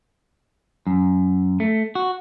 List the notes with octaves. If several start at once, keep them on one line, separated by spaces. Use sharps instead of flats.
F#2
A3
F#4